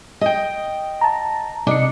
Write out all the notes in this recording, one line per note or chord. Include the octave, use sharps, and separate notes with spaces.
D#5 G5
A5 A#5
C3 D4 D#5 C#7